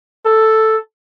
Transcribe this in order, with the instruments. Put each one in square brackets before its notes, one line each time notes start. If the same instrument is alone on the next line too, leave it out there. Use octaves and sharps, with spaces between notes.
[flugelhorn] A4